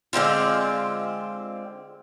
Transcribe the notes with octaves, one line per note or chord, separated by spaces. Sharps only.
D3 G#3 C4 F4